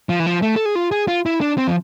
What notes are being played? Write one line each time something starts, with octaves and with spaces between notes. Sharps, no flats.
F3
E3
F3
A3
A4
G#4
F4
G#4
F4
E4
D4
C4
F3